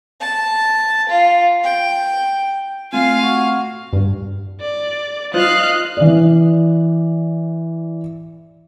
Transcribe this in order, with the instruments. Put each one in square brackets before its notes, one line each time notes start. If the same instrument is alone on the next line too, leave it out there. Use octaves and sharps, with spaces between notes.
[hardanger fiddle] A5
F4
G5
[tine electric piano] A3 C4 [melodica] F4 G#5 [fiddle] F5
[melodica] F#4
[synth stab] G2
[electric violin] D5
[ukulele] D#4 F4 C5 [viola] D#5 F5 [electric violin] F#6
[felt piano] E3 D5